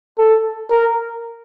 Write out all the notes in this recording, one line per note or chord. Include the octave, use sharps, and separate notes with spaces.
A4
A#4